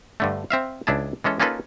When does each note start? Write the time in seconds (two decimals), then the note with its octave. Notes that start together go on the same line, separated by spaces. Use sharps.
0.20 G2 D3 A3
0.50 C4 E5 F5
0.87 C#2 D4 E4 G#4 A5
1.24 E3 G#3 C#4 A4
1.40 A#3 C#4 D#4 F4 A4 B4